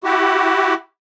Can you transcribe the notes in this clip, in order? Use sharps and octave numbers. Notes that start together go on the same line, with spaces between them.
E4 F#4 G4